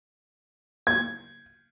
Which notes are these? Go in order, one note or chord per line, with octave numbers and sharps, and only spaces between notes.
G#6